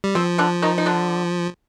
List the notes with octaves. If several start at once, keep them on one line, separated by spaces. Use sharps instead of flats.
G3
F3 C4
D3 D4
D#3 D#4
D#4
D3 D4